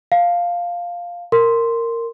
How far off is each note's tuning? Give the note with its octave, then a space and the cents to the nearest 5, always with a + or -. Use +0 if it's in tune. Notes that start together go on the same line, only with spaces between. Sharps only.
F5 +0 A5 +0
A#4 -15 C6 -5